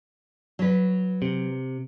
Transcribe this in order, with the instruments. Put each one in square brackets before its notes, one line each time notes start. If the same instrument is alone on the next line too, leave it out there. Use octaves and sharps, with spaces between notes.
[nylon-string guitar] F#3 B4
[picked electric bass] C3